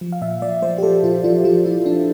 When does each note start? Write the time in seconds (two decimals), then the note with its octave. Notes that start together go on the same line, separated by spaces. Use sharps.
0.01 F3
0.12 F5
0.22 A#2 E5
0.42 F3 D5
0.62 F3 C5
0.78 G4
0.83 F3 A4
1.03 A#2 F4
1.24 F3 F4
1.44 F3 F4
1.65 F3 E4
1.86 F3 D4